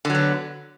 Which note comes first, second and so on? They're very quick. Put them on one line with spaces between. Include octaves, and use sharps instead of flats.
D3 F#3 B3